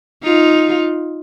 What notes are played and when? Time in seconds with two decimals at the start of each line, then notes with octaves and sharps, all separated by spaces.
0.23 D#4 F4